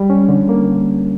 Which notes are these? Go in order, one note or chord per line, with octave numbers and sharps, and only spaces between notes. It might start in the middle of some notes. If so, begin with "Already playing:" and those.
Already playing: G3
C#4
D3
A#3